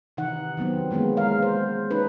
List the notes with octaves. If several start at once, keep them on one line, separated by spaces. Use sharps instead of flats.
C3 D#3 E3 D#4 F#5
D#3 F#3 B3 C4
E3 G#3 A#3 B3 C#4
G#3 A#4 F5
C5
C#4 D#4 B4